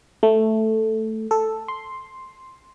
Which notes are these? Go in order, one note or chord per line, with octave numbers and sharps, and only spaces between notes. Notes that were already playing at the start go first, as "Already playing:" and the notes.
A3
A4
C6